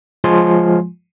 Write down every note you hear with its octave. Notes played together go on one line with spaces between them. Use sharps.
F3 G#3 F4 G#5 C6